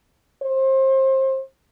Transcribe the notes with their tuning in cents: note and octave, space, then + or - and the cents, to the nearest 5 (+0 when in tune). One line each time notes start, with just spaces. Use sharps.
C5 +30